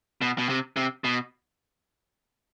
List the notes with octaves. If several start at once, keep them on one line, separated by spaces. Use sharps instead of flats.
B2
B2
C3
C3
B2